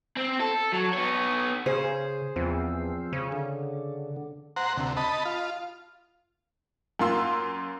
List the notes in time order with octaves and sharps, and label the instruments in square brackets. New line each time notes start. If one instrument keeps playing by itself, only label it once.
[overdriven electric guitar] C4
A4
F#3
B3 C#5
[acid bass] C#3 [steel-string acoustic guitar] G#4 C5
[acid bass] E2 [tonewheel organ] F3 C4
[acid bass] C#3
[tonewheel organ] D3
[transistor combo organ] C5 F#5 A#5
D2 C3
D#5 A5 B5
F4
[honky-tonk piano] F#2 A#3 F4 C6 E6